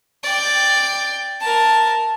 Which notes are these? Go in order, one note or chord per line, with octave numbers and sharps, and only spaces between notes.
D5 G5
A#4 A5